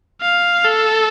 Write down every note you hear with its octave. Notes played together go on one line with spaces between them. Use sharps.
F5
A4